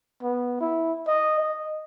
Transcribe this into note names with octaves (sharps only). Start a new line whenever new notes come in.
B3
E4
D#5
D#5